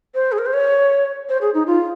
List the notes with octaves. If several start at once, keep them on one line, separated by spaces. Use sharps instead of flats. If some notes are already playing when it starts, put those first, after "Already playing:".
C5
G#4
A#4
C5
C#5
C5
G#4
D#4
F4